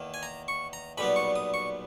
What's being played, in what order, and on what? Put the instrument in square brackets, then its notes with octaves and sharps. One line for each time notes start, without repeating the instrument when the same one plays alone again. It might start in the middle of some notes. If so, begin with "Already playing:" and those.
Already playing: [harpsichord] E2 D#3 A#3
G#5
A#5
C#6
A#5
B1 A#2 G3 B3 B5
C#6
D#6
C#6